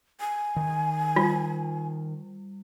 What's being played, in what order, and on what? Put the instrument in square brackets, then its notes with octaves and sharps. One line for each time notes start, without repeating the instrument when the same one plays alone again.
[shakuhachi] G#5
[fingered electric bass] D#3
[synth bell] G3 [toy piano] F4